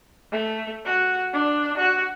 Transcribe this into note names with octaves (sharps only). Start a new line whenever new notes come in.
A3
F#4
D4
F#4